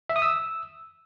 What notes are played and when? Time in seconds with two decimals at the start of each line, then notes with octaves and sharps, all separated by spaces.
0.09 E5
0.16 D#6
0.22 E6